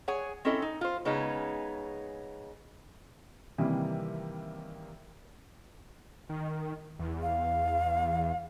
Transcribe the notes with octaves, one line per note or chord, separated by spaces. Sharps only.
G#4 C#5 F#5 G#5
C4 C#4 E4 A4 D#5
D#4
F4 C5
C#3 G#3 B3 C#4 D#4
C3 D#3 E3 G3 A#3
D#3
E2
F5